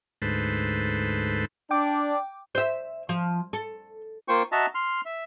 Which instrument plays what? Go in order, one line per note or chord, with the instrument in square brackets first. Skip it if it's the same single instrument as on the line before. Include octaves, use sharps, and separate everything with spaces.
[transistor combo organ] D2 G#2 A4 B4 C5
[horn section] D4 [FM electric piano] G5 D6
[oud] C5 E5
F3
A4
[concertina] A#3 F4 C5 G5 C#6
F#4 D#5 E5 A5 A#5
C6 F6
E5